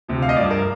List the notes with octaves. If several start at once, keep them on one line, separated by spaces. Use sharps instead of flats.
D2 C3 F3
F5
D#5
G2 F3 D5
A#4